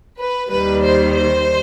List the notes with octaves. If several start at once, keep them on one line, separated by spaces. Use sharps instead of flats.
B4
D#2 D#3 G3 B4
C5
C5